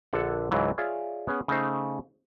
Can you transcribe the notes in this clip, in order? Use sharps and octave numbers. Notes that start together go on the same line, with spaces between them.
A#1 D3 A4 F#5
C#2 G#2 E3 F#3
F4 G#4 C#5 D5 E5 F5
B3 C#4 G#4 F#5
C#3 A3 D#4 C5